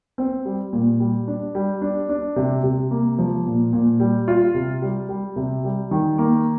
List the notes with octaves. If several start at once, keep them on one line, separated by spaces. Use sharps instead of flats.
C4
G3
A#2
G3
D4
G3
D4
D4
C3
C3
A#3
F3
A#2
A#2
G3
F4
C3
G3
G3
C3
G3
D#3
A#3